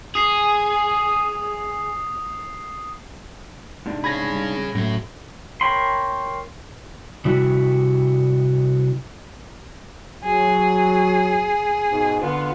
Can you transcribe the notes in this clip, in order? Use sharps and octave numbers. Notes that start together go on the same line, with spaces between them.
G#4 D#6 C7
G#2 C3 G#3 D4
G#4 C#5 B5 G#6 A#6
G3
F#2 A2 A3
A#4 C#5 G5 B5 C6
C3 G3 E4 F#4
F#3 G#4
G#2 B2
D3 B3 F4